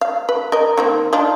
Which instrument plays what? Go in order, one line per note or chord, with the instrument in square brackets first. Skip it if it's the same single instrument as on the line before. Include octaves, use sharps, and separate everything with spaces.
[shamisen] F5
B4
A#4 D#5
D#3 A#3 C4
D4 D#4 F4